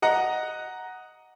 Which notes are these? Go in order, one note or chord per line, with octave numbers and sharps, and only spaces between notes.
D#5 F#5 A#5